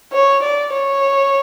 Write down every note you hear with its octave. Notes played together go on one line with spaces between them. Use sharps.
C#5
D5
C#5